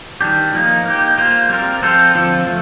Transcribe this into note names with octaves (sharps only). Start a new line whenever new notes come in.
D#3 G3 D4 G4
F3 A#3 D#4
A#3 D#4 G4
A#3 F4 C5
G3 C4 F4 A#4
F3 C4 F4 A4 C5
D3 F3 C4 F4 A4
F3 A3